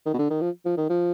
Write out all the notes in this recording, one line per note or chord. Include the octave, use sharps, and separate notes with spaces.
D#3
B2
D3
D#3
F3
F3
D#3
F3